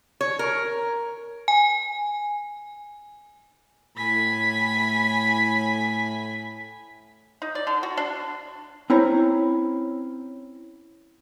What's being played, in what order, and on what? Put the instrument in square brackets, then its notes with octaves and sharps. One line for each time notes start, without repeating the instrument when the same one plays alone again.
[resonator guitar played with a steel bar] C#5
A#4
[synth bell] G#5
[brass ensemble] A2 [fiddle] G#5 B5 [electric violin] B6
[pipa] D#4
D5
D3
F#4
D4
[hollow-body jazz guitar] C4 C#4 E4 C5 C#5 A#5